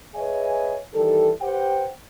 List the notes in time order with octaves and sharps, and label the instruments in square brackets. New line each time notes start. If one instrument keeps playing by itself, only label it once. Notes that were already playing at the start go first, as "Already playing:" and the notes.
[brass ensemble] G#4 B4 C#5 D#5 E5 G#5
D#3 E3 G3 G4 A4
G4 B4 C5 F#5 G5